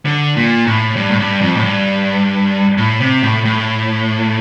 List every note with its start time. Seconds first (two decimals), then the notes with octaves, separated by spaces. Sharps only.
0.05 D3
0.37 A#2
0.67 A2
0.96 G2
1.11 A2
1.19 G2
1.41 F2
1.57 A2
1.64 G2
2.78 A2
3.00 C3
3.23 A2
3.45 A2